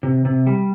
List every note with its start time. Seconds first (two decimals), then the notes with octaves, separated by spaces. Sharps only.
0.03 C3
0.25 C3
0.47 G3